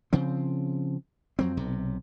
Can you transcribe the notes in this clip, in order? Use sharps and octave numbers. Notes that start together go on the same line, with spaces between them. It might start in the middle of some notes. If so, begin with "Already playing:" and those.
C#3 F3 C4
F2 F#3 C4
B1 C3